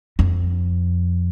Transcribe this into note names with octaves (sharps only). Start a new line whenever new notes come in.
F2